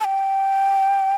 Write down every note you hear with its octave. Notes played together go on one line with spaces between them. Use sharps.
A5
G5